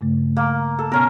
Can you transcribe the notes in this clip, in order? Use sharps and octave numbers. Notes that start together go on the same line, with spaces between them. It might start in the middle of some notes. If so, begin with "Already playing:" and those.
G2 C#3 A3
A#3
A4
B2 B3 C#4 A#4